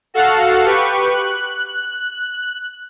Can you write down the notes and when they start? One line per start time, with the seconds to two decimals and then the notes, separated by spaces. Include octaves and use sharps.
0.14 F#4 A4 F5 F#5
0.65 G4 B4 C#6
1.12 F#6